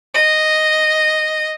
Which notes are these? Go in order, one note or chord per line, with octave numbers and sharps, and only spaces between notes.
D#5